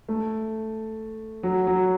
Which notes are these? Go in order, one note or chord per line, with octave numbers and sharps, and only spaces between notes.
A3
F#3
F#3